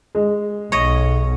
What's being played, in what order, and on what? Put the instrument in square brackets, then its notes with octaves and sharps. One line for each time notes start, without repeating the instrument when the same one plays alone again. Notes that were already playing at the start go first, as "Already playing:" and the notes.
[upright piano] G#3
[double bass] B1 [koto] C#5 D#5